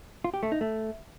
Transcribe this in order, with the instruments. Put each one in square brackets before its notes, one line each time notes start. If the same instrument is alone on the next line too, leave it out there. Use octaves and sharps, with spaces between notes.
[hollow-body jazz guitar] F4
G4
A3
D#4
A3